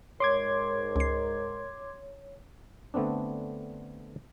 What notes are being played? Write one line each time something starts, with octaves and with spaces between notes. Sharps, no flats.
G#2 A#4 C#5 C6 D6 G#6
C#2 C7
D3 A3 B3 C4 D4